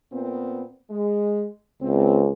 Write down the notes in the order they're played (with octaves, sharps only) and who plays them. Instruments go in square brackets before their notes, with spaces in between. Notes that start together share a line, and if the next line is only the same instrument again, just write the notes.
[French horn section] A#2 B3 C4
G#3
[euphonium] C#2 [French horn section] C4